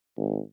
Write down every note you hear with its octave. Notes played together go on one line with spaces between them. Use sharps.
G#1